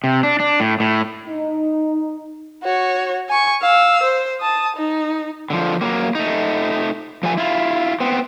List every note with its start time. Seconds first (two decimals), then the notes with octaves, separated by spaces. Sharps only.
0.04 C3
0.23 D4
0.40 D4
0.60 A2
0.80 A2
1.27 D#4
2.63 F#4 C#5
3.29 G#5 C#6
3.62 F5 E6
4.03 C5
4.40 A5 D#6
4.76 D#4
5.50 D3 F3
5.81 F#3 A#3
6.15 A3 D#4
7.23 F3 A3 G#5
7.38 E4 F4
8.00 B3 C4